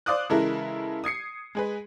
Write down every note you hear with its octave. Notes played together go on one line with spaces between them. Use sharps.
C5 D5 F5 D6 D#6 F#6
C#3 E3 G#3 E4 A4 A#4
D#6 G#6 C7 C#7
G#3 G#4 B4